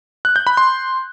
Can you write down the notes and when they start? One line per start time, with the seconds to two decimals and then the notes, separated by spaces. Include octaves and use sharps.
0.25 F#6
0.36 G6
0.47 B5
0.57 C6